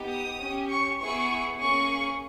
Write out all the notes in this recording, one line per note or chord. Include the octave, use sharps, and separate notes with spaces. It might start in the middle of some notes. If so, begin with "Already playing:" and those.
Already playing: B3 D#4 G4
D#6
C#4 G4
C#6
B3 E4 G#4 C#6
A#3 C#4 G#4 C#6